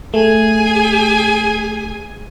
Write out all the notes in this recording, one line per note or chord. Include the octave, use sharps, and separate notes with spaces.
A3 G#4 G#5